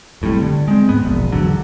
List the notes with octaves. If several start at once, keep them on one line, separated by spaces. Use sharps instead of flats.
F1 A2 C3 G3
D3
G#3 C4
G#2 B3
E1 A#1
G#1 E2 D3 F#3